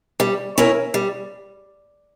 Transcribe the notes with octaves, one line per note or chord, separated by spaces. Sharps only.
G3
C#4 E4 A#4 C#5
G3